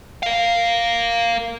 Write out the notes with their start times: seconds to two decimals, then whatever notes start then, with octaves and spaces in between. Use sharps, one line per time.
0.23 A#4 F5